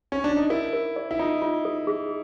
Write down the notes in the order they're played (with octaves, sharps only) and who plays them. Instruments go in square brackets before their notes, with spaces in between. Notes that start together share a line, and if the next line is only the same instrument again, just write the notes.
[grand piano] C#4
D4
D#4
[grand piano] E4 [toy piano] A#4
[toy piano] A#4
D5
[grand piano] E4
[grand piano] D#4 [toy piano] F4
[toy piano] F4
A4
G#4